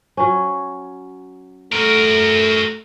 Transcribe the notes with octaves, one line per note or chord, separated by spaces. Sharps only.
F#3 C#4
A3 F#4 A#4